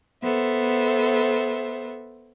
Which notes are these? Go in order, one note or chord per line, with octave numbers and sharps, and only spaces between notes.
B3 A4 C5 E5